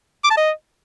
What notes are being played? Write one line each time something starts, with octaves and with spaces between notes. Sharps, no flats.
D6
A5
D#5